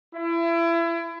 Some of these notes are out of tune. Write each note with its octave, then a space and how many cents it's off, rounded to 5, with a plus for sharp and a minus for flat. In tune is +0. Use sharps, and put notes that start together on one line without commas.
E4 +30